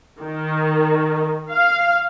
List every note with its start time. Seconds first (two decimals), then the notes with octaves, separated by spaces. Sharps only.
0.20 D#3
1.49 F5